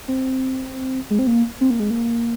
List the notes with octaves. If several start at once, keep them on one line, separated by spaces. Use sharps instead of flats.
C4
G#3
C4
A#3
C4
A#3
G#3
A#3